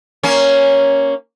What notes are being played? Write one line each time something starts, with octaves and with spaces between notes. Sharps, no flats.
A#3 C#4